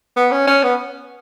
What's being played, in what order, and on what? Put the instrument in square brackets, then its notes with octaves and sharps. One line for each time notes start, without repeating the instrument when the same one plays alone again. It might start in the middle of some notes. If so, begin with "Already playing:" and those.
[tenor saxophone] B3
C#4
C#4
B3